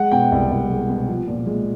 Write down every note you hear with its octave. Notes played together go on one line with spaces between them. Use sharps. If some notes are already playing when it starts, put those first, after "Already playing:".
Already playing: G#3 F#5
B2 G5
C2
C2
G#3
B2
F3
A#2
G#3